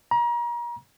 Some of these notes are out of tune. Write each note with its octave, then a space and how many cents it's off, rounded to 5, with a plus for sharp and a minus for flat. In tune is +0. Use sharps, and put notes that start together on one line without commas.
A#5 +35